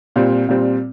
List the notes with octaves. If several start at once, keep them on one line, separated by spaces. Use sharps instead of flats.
A#2 G3 C4
A#2 G3 C4